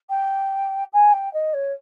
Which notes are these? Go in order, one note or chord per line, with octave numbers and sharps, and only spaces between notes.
G5
G#5
G5
D#5
C#5